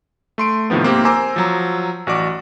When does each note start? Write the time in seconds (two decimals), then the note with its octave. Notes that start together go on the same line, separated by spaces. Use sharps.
0.38 A3 C6 D7
0.70 A2 C3 D#3 F3 B3
0.83 G#2 A#3 C4 G4
1.05 C5 G#5 A#5 D6 E6
1.36 F3 F#3 A#5
2.07 A1 F#4 D5 D6